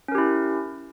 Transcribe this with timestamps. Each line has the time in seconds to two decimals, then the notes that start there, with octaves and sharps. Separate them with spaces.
0.08 C#4
0.12 A#4
0.15 G4
0.18 E4